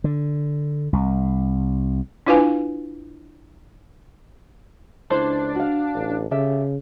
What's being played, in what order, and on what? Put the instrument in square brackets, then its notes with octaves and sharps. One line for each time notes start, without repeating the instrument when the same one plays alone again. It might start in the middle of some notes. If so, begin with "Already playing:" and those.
[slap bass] D3
C2
[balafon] D4 E4 F4 B4 F5 G#5
[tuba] C#2 [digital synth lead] D4 [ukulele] E4 A4 C5
[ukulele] F#4 F5
[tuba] A1
[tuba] C#3 [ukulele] G4 A4 E5